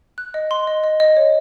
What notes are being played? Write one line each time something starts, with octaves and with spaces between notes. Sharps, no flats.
F#6
D#5
C6
D#5
D#5
D#5
C#5